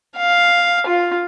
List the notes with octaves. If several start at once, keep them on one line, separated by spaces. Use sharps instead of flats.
F5
F4